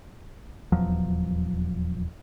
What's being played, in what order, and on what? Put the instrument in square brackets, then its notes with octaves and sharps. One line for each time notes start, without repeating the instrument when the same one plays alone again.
[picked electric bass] D#1 E2 F3 F#3